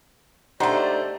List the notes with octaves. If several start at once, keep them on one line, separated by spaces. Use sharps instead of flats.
A3 D4 D#4 G4 C5 D5 F#5 A#5